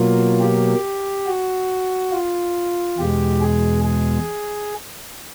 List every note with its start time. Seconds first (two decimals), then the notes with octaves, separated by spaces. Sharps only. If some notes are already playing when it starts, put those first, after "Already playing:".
Already playing: B2 F#3 A#3 F4
0.40 G4
1.26 F#4
2.12 F4
2.98 E2 B2 G#3 G4
3.41 G#4
3.84 G#4